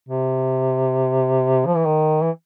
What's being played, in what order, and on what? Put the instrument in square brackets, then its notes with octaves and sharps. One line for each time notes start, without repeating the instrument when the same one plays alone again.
[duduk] C3
F3
E3
D#3
E3